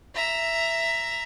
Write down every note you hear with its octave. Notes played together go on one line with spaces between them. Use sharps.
E5 A#5